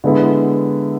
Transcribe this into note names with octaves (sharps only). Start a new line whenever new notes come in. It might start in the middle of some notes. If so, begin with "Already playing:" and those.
D3 G#3 B3 E4